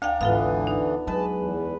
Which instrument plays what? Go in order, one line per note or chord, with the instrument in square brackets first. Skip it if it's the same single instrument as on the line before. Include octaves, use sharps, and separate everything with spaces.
[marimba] D2 F5 G5 [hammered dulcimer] D4 A#5
[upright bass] G#1 G#2 [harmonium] D3 E3 [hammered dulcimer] B3 [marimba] F4 A4 F5
[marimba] D#4
[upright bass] F#3 [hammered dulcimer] G#3 B4 [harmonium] A5
[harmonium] E2